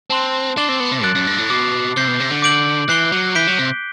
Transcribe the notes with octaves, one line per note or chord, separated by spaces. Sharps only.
C4 A5 C6 F#6
D4 D6 A6 C7 E7 G7
C4
B3
C3
F#2 F#6 A6 D7 F#7
F#2
G2
A2
B2 D6 A6 C7
C3 G6 C7 G7
B2
C3
D3
D6 G6 D7 F#7
E3 F#6 C7 G7
F#3
E3 G6 B6 D7 G7
F#3
C3